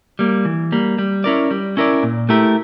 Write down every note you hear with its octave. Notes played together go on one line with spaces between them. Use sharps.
G3 A#3
E3
G3 A#3
G3
C#4 E4 A#4 D5
G3
C#4 E4 A#4 D5
A#2
A3 E4 G4 A#4